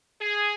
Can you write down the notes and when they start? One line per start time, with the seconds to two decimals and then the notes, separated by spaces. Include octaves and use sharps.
0.20 G#4